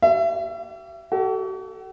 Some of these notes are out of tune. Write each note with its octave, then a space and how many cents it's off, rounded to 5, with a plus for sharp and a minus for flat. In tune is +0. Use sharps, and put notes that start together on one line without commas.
G4 -45 E5 +35
F#4 +45 A4 +5